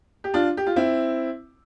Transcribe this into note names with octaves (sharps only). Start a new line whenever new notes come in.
G4
D4 F4
G4
F4
C4 E4